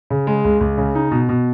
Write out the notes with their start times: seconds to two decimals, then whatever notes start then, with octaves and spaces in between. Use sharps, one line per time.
0.10 C#3
0.27 G#3
0.44 C#2
0.61 C#2
0.78 C#3
0.95 D#4
1.11 B2
1.29 B2